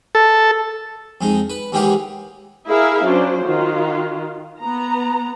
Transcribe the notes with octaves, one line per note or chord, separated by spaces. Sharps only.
A4
F2 G#3 D#4
B4
D#2 E3 G#3 G4 F5 F#5
E4 G#4 A#4 E5 F5
F#3 C#4 D4 C5
D#3 F4 F#4
B3 A#5